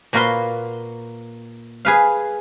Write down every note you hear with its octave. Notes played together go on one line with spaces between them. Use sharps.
A#2 A#3 F#4 A#4 B4 C6
G#4 B4 F5